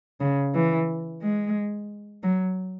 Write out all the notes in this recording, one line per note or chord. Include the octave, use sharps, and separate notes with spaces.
C#3
E3
G#3
F#3